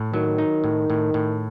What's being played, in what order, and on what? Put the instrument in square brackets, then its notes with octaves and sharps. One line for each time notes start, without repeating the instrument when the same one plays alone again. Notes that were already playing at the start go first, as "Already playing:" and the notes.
Already playing: [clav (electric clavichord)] A2
[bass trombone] D#3 [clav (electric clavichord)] F#3
[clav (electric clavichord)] D#4
A2
A2
A2